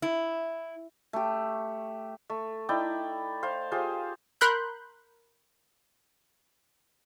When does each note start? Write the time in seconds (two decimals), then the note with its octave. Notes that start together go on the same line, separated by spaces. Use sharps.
0.02 E4
1.13 A3 G4
2.30 A3
2.69 D#4 E4 D5 G5
3.43 C5 F5
3.72 F4 G4 G#4 C5
4.41 A#4 B5 C6 F#6 G6